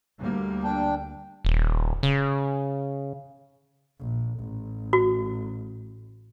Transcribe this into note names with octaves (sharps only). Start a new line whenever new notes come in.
D2 G3 A#3
D4 G5
D#1
C#3
A#1
A1
F#4